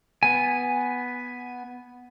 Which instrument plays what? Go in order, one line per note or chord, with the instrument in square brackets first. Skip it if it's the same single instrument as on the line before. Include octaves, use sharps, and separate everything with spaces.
[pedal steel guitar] B3 G#5